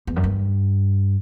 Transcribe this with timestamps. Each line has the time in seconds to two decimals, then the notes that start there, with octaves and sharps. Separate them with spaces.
0.07 E2
0.16 F#2
0.24 G2